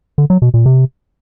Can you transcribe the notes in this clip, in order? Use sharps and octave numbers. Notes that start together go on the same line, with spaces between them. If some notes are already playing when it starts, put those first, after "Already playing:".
D3
F#3
B2
A#2
C3